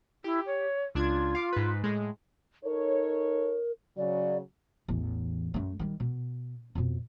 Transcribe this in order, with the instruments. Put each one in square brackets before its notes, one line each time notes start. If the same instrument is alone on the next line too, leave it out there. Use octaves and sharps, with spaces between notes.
[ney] E4 [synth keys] G4
[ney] C#5
[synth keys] C#2 D4 G#6 [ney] F4
[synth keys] F5 D6
G#2 B4
A2 G#3
[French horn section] D#4 A4 C#5 [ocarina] A#4
[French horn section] C#3 F#3 [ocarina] D5
[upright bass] A1 E2
F#2 A3
D#3 G3
B2
F2 B2